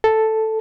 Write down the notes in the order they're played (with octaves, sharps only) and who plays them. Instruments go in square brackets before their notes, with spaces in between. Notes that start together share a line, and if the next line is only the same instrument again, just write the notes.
[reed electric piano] A4